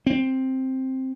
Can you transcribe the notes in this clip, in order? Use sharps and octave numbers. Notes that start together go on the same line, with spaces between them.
C4